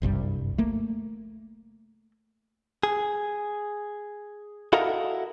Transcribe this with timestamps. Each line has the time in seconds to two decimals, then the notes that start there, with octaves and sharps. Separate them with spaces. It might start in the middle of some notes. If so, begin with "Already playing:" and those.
0.02 F#1 C2 G2 G3
0.58 A3 A#3
2.83 G#4
4.73 E4 F#4 A4 A#4 D#5 F5